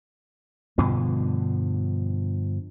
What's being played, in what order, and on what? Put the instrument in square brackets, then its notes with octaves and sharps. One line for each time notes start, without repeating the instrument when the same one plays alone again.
[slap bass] G2 B2 D3 F3